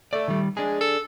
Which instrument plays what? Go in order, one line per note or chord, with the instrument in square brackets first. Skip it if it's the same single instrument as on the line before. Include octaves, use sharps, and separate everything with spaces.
[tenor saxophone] A3 [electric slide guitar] A4 D5
[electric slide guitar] D#3 G3
[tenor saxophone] G#3 [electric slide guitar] D4 G#4
[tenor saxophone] A4